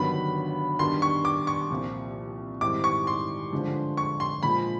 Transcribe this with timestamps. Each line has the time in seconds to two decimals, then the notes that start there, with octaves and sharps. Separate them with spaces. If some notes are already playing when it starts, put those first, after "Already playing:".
Already playing: G1 G2 D#3 F#3 B3 B5
0.79 G2 D#3 G3 B3 C6
1.02 C#6
1.25 D6
1.47 C#6
1.70 C2 A#2 F3
2.61 G#2 D#3 G3 C4 E4 D6
2.84 C#6
3.07 C6
3.52 G1 G2 D3 F3 G#3
3.97 C#6
4.20 C6
4.43 A#2 F3 G#3 B5